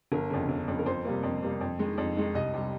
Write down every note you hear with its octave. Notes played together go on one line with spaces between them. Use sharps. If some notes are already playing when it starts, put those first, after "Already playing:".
G1 A#4
F2 C#3
G1
F2 C#3
A#4
F2 C5
C3 G3 A#3
F2
C3 G3 A#3
F2
D#3 G#3 D#4
F2
D#3 G#3 D#4
C2 D#5
C3 G3